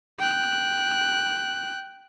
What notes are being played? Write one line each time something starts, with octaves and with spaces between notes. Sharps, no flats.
G5 F#6